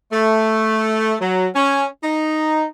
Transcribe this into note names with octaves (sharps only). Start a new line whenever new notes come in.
A3
F#3
C#4
D#4